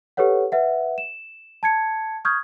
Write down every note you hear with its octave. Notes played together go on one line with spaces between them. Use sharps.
G4 A4 B4 C#5 F#5
B4 E5 F#5
E7
A5 G#6 C#7
C#6 D#6 F6 G6 G#6